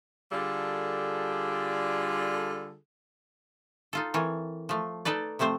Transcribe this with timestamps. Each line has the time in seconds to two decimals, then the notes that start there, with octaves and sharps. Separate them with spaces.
0.32 D3 G3 F4 G#4 A4
3.93 D#4 F4 A4
4.14 E3 C4 A4 A#4 C#5
4.69 F3 A3
5.05 D#4 A4 B4 D5
5.39 C3 F3 A3 C4 C5